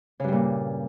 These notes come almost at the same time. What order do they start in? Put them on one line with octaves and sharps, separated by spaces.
C#3 G2 G3 A#2